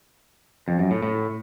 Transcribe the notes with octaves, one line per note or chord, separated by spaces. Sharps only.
F2
F#2
A2
A2